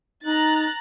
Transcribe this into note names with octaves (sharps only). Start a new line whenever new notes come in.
D#4 A#5 F#6 A6